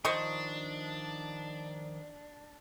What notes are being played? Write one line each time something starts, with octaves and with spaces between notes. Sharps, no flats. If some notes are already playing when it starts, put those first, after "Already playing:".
D#3 F3 D4 D#4 C5 D#5 C#6